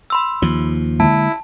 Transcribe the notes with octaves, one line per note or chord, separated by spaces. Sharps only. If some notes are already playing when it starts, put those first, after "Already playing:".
B5 C6 E6
D#2 F3
D3 G#3 A#3 E4 A5